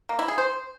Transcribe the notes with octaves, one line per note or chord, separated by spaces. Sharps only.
A#3
E4
G#4
C5